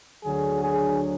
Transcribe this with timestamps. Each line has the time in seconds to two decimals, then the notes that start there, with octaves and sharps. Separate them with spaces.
0.24 D2 D3 F#3 G#4
0.63 G#4